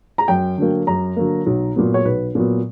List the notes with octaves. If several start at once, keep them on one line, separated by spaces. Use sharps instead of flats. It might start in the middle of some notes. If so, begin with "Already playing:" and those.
A#5
F#2 G5
D3 F#3 A#3
F#2 A#5
D3 F#3 A#3
B1
A#2 F#3 B3
C#5
B1 B4
A#2 F#3 B3